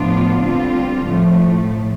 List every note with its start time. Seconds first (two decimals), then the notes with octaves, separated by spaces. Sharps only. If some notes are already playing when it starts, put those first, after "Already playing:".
Already playing: A2 F3 B3 D4 F4
0.40 D3 G3 C4 F4
1.05 A2 F3 A3